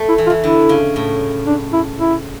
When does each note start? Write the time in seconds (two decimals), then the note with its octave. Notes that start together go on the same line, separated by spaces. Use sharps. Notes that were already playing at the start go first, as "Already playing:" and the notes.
Already playing: A3
0.09 E4
0.18 E3
0.27 F4
0.30 E3
0.43 D3 E4
0.69 C#3
0.96 A2
1.47 D4
1.73 E4
1.99 E4